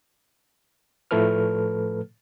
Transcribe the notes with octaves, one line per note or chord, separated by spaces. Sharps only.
A2 F3 A3 A4 B4 F6